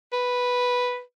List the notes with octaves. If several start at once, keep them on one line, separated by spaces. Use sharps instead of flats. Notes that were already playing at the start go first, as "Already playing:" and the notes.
B4